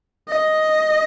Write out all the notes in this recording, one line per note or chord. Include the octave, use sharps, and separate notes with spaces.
D#5